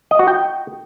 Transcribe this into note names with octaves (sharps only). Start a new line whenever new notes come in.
D#5
F#4
G5